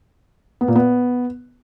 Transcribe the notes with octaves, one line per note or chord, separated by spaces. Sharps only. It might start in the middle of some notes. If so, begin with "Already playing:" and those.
B3
A#2
B3